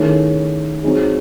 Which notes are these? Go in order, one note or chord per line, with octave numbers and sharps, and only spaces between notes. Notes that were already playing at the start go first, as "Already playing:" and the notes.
Already playing: D#3 A3 C#4 E4 G#4
F#3 C4 D#4 G#4